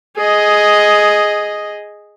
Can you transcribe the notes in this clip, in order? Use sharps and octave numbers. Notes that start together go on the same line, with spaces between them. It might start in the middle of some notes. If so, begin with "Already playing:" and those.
G#4 D#5